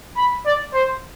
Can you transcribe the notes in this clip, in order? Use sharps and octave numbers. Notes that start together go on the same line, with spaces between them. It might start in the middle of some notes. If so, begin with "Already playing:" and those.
B5
D5
C5